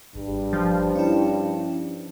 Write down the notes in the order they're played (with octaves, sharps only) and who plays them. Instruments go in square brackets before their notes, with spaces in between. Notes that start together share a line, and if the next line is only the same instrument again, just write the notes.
[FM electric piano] G#1 [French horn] G2
[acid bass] F3
[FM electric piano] C#4 E4